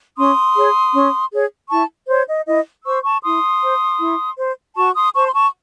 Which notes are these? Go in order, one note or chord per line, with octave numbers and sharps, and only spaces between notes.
C#4 C6 D#6
G#4 C#5
C#4
G#4 C#5
E4 A5 C#6
C5 C#5
D#5
E4 D#5
C5 C#6 E6
A5 C#6
E4 C6 D#6
C5
E4
C5
F#4 A5 C#6
C6 D#6
C5 A5 C#6
C6
A5 C#6